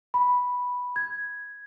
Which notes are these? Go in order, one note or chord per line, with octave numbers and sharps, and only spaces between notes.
B5
G#6